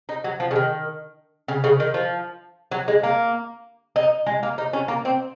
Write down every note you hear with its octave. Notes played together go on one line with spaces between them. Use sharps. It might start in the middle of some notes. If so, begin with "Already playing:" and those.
D#4
F#3
F3
C#3
D#3
C#3
C#3
D#3
F3
F#3
G#3
A#3
D#4
G#3
A#3
D#4
C#4
A#3
C4